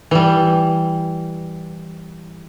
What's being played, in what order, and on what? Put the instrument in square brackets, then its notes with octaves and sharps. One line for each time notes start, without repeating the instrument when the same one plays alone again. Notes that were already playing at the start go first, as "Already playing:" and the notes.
[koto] E3 G3